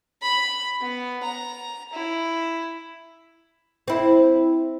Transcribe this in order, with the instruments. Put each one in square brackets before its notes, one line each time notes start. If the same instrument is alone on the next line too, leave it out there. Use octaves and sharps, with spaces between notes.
[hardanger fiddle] B5
B3
A#5
E4
[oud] C4 E4